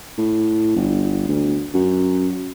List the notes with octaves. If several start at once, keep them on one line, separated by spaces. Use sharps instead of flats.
A2
G1
D2
F#2